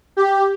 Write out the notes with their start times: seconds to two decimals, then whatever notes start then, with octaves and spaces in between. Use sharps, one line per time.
0.17 G4